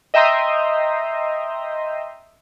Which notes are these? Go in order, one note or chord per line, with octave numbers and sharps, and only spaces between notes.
D#5 E5 G5 A#5 C6 D#6